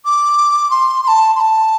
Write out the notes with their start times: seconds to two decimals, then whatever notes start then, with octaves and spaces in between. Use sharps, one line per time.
0.05 D6
0.71 C6
1.03 C6
1.08 A5
1.36 C6
1.40 A5